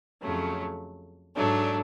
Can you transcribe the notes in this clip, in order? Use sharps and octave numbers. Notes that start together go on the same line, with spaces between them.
F2 C#3 F#3 A3
G#2 F#3 A3 D4